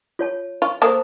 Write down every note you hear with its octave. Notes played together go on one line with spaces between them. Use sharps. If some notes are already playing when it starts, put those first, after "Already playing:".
F4 C#5 A5
F4 C#6
A#3 A4 C5 D#6